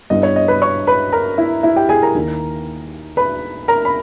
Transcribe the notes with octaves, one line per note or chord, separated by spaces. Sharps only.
G2 G3 B3 E4 D#5
C#5
D#5
B4 B5
C#5 C#6
B4 B5
A#4 A#5
E4 E5
E4 E5
G4 G5
G#4 G#5
A#4 A#5
D#2 D#3 A#3
B4 B5
A#4 A#5
B5